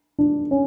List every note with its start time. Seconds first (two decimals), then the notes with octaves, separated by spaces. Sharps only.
0.19 D4
0.51 C#4